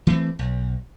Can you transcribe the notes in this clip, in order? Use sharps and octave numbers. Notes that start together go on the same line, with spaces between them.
E3 A3 C4
B1